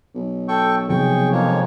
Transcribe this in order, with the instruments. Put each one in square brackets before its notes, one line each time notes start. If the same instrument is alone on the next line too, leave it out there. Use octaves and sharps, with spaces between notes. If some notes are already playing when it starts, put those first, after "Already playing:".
[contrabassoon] B1
[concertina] A4 G5 C#6
[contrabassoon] B1 [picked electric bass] C3 F3 [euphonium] G#4 [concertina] G5 C#6
[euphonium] F2 [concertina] G#3 A#3 C#5